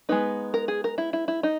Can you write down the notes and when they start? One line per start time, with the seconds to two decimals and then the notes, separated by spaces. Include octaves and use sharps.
0.09 G#3 B3 D#4 B4
0.54 A#4
0.68 G#4
0.84 A#4
0.98 E4
1.13 E4
1.28 E4
1.43 D#4